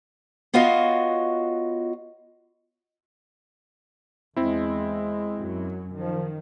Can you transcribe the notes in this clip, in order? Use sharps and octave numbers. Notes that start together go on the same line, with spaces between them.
B3 F4 F#4 C#5 D#5 F5
E2 G#3 C4 E4
F#2 F#3
D#3 F3